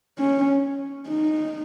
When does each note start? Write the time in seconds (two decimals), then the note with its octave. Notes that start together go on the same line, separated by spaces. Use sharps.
0.19 C#4
1.08 D#4